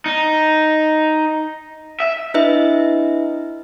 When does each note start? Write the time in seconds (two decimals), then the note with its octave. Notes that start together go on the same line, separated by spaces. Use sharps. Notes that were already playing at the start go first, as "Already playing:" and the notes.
0.06 D#4
2.00 E5
2.34 D4 E4 B4 D#5 E5